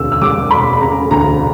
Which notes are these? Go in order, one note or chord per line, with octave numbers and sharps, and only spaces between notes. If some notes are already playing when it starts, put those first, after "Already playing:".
Already playing: E1 D2 C#3 E6
E6
G3 D6
E1 B5
C#3 A#5
D2 A#5